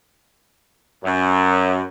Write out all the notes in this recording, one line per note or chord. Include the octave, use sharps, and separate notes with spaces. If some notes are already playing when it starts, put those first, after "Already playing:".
F#2